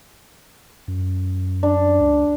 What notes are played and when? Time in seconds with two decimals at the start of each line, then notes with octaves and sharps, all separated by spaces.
0.88 F#2
1.63 D4
2.01 C#2